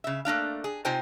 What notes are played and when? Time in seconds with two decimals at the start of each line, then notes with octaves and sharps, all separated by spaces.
0.04 C#3 E5
0.25 A3 A#3 D4 F5
0.64 G#4
0.85 C3 D#4 F4 C5 G5 G#5